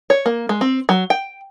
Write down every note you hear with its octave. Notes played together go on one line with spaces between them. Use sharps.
C#5
A#3
G#3
C4
F#3
G5